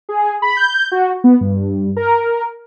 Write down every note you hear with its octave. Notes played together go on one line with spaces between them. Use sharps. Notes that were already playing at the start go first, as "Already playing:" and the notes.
G#4
B5
G6
F#4
B3
G2
A#4